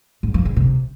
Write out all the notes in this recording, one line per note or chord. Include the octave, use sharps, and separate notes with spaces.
G#2
F3
C#3
C3